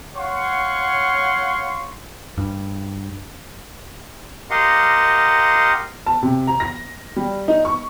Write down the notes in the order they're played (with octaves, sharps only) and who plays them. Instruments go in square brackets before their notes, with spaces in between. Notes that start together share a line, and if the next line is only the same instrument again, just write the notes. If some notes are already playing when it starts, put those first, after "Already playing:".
[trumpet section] C#5 F5 F#5 C6 C#6
[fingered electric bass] G2
[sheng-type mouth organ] G4 A#4 D#5 F5 F#5 C6
[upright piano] A5
C3
A#5
A#6
G3
D#4
C#6